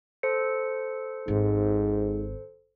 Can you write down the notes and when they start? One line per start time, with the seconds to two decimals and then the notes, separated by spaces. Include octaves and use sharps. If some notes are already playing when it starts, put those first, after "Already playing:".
0.23 A4 C5 C#7
1.28 G#1 G#2